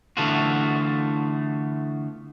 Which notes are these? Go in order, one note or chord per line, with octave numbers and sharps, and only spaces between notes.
D3 E3 A3 B3 F4 F#4